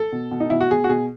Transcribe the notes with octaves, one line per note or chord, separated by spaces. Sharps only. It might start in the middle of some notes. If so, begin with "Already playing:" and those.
Already playing: A4
B2
B2
D#4
B2 E4
F#4
B2 G#4
F#4
B2 G#4